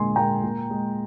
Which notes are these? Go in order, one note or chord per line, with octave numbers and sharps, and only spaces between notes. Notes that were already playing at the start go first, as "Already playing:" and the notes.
Already playing: A#2 D3 G#3 G#5 C6
A#2 G5 A#5
A#2
G#3